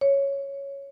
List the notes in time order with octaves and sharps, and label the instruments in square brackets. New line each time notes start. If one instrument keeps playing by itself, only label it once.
[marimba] C#5